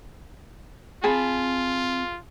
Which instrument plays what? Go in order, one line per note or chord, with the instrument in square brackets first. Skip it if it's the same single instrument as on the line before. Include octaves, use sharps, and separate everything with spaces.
[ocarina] C4 [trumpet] F4 [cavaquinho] G#4 A5 B5